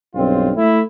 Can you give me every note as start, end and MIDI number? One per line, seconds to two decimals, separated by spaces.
0.15 0.51 35
0.15 0.51 43
0.15 0.51 60
0.15 0.51 65
0.56 0.81 57
0.56 0.81 64